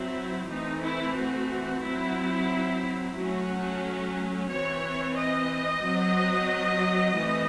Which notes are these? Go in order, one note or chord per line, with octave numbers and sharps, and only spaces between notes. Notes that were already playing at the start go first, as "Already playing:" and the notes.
Already playing: F#3 C4 E4
E3 A3 C4 D#4
E4
F#4
F#3 C4 E4
F#3 A3 C#4 F#4
E3 C4 C#5
D#5
F#3 C4
E3 A3 C4